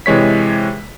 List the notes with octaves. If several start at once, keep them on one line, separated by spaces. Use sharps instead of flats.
C3 E3 G#3 C#5 B6